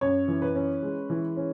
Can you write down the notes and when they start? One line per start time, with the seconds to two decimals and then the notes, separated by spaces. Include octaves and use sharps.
0.01 F#2 C#5
0.28 E3
0.42 B4
0.55 C#4
0.83 G#3
1.10 E3
1.36 C#4